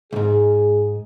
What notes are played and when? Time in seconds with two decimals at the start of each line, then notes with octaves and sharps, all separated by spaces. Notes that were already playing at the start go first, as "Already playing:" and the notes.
0.13 C2 G#2 G#4